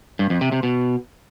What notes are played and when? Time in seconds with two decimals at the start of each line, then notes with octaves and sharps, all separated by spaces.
0.19 G2
0.30 F2
0.41 C3
0.52 C3
0.63 B2